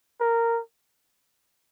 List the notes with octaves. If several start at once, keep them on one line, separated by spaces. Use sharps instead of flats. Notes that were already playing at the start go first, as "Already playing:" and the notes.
A#4